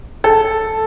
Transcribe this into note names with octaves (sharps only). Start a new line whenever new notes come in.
A4